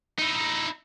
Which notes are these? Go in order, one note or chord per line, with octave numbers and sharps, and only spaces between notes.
D#4 E4